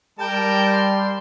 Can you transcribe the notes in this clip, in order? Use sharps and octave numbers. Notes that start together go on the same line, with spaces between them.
G3 A#4 G5 A5
C6